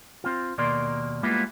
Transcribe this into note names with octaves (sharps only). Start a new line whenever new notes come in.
C4 F4
D#2 B2 A#3 A#4 D5 C6
G3 G#3 A#3 B3 E4 F4